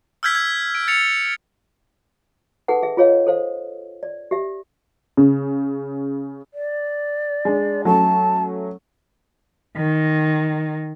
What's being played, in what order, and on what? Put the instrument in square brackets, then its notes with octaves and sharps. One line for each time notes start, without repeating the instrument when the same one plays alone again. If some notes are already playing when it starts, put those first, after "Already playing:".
[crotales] E6 F6 G6 G#6 B6
G#6
D7
A6 C#7 F7
[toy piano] D#4 G#4 A4 B4 F#5
G#4 E5
F4 G#4 C#5 D#5 F5
A4 C5 F5
D5
G4 E5
[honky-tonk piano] C#3
[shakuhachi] D5
[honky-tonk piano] G#3 D4
[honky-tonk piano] F#3 A3 C#4 [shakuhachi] A5
[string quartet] D#3